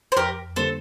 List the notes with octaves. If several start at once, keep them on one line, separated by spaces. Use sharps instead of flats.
C5
F2 G4 A#4
D3 G3 A#3 A4 C5